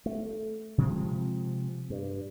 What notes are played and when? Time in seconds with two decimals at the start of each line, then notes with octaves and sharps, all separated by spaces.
0.06 A3
0.78 C3 F3 G#3 C4
1.90 G2